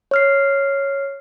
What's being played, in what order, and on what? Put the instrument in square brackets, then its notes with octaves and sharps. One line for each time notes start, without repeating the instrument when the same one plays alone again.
[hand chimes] C#5 F6 C7